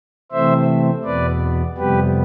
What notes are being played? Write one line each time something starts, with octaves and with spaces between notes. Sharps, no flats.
C3 E3 A3 C4 C5 E5
E2 B2 B3 B4 D5
F2 C3 G3 B3 G4 B4